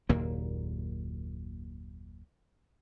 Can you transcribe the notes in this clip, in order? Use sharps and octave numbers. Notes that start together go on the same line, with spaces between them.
F#1 D#2 A#2 A#3